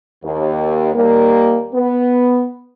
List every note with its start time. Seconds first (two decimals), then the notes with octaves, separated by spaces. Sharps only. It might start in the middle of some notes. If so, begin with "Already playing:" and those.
0.24 D#2
0.94 D#2 G3 A#3
1.74 B3